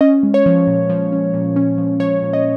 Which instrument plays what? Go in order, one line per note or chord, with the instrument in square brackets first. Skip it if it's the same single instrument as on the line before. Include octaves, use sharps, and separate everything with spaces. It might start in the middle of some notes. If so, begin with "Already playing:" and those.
[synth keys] C#4 D#5
G#3
C#5
F3
A#2
F3
C#4
A#2
C#4
F3
F3 C#5
A#2
D#5